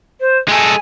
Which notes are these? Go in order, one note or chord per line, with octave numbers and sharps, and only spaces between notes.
C5
G#3 A4 G#5